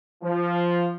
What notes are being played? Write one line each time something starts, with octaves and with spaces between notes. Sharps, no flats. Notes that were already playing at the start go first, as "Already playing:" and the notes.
F3